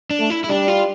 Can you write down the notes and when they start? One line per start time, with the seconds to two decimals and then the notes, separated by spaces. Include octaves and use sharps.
0.10 D4
0.20 A3
0.30 E4
0.44 E4
0.48 G3 D4
0.68 F4